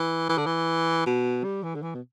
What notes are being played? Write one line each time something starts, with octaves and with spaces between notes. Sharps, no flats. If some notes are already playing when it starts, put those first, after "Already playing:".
Already playing: E3
E3
D3
E3
B2
G3
E3
D3
E3
B2